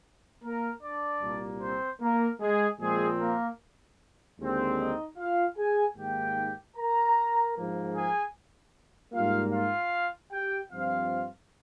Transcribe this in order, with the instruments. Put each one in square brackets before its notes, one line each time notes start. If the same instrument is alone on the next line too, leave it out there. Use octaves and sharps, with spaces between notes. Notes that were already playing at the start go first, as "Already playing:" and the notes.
[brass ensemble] A#3 A#4
D4 D5
C2 A#2 G3 A#3
C4 C5
A#3 A#4
G#3 G#4
A#2 F3 G#3 C4 G#4
A#3 A#4
D#2 D3 G#3 C4
D#4 D#5
F4 F5
G#4 G#5
G#2 D#3 A#3 G4 G5
A#4 A#5
G#2 F3 A#3
G#4 G#5
G#2 G3 A#3 F4 F5
F4 F5
G4 G5
G2 F3 C4 F4 F5